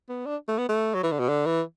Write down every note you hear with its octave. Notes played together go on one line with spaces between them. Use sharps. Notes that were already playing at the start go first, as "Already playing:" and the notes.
B3
D4
A3
B3
A3
F#3
E3
D3
B2
D3
E3